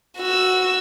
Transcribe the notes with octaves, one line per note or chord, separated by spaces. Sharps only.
F#4 E6